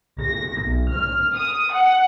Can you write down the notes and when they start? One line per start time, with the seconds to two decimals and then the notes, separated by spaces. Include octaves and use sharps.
0.21 A#6
0.61 B1
0.92 F6
1.35 D#6
1.73 F#5